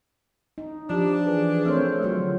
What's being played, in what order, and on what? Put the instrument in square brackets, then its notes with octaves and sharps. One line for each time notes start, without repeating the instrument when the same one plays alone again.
[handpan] D#4
[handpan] F3 [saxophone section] D4 [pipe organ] G4 A5
[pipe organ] E3 [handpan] G#4
[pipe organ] A3 A4 A#4 [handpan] C4 C5 C#5
[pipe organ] D3 F4 [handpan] F#3